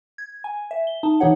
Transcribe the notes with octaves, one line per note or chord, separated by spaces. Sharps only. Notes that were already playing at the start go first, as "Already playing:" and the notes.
G#6
G#5
E5
G7
D#4 A5
E3 D#4 G4 C#5 F#5